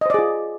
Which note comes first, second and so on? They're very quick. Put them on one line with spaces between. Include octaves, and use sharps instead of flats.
D#5 C5 D5 G#4 F4